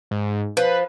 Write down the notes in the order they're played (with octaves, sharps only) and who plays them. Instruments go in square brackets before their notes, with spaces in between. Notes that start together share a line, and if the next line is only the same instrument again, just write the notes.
[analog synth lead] G#2
[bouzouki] F3 [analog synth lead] B4